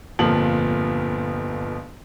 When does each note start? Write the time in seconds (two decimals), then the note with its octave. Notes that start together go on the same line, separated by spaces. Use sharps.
0.19 G1 F2 A#2 F3 A5 F#7